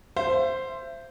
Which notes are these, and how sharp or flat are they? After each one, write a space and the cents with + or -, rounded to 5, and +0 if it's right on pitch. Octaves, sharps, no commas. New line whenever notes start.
C5 +0 E5 +35